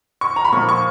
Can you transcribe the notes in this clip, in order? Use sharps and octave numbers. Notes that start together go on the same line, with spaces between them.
C#6
A#5
B5
A#2 F3 C#6
C#6